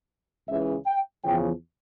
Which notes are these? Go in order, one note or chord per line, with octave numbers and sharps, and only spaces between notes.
C#2 C#3 E3 E5
G5
E2 C#3 F3 G5